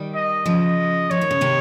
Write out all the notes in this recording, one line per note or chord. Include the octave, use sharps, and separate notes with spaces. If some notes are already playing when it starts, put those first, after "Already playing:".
Already playing: D#3 G3
D#5
C#3 F3 D#5
F3 C#5
D#3
C#3
C3 D#3